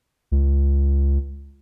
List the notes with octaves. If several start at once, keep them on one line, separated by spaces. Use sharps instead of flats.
C#2